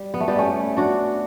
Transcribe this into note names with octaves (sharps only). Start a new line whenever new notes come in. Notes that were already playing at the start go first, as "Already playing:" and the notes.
Already playing: G3
B3
A3
G3 B3
A3 C#4
D4 F#4